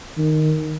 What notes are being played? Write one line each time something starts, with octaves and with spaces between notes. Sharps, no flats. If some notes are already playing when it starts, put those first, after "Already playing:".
D#3